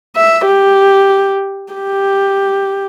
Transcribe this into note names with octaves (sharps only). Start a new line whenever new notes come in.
E5
G4
G4